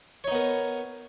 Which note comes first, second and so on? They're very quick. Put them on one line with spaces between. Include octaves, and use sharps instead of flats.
C#5 D#4 B3 A#4